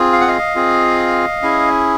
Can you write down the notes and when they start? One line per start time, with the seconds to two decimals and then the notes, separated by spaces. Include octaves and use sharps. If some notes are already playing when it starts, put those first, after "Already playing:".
Already playing: C4 F4 G#4
0.12 F5
0.21 F#5
0.27 D#5 F5
0.56 C4 F4 G#4
1.42 C#4 E4 G#4